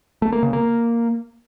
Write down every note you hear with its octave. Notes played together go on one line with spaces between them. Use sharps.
A3
A#3
C#3
A#3